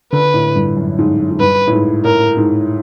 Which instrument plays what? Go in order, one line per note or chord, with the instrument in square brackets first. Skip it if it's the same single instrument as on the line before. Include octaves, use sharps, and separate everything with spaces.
[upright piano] D3 [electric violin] B4
[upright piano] A2
G2
F#2
G#2
F#2
G#2
[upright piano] G2 [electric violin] B4
[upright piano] A2
G#2
[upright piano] A2 [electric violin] A#4
[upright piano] G#2